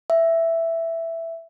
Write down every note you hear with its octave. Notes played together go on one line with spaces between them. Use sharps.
E5